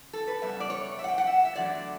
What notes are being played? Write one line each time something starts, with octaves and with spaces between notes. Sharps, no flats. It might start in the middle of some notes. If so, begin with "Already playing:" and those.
Already playing: C#3
A4
B4
C#3 G3 B3 E5
D5
C#5
E5
F#5
G5
F#5
E5
E5
E2 D3 F#3 A3 D5